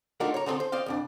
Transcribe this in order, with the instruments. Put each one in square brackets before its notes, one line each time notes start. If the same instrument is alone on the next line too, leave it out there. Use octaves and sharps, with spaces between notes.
[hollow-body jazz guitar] A3 D4 D#4 F4 F#4 A#4
C#5 A#5
D3 G3 C4 G#4 A4
C5
C5 D5 D#5 F5
C2 F2 D4